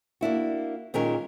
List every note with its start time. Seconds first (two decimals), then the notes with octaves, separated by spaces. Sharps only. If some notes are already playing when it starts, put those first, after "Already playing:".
0.21 A#3 D4 E4 F#4
0.94 A#2 D#3 G#3 C#4 A#4 C#5